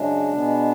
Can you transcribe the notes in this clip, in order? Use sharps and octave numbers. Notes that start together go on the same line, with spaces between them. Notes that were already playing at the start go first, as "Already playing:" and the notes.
Already playing: F#2 C#3 G#3 D4
B2 G#3 B3